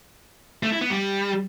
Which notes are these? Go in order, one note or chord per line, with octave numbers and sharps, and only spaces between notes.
A3
E4
B3
G3